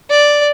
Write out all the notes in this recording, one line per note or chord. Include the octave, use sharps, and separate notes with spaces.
D5